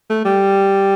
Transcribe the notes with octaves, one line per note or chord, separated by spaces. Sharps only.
A3
G3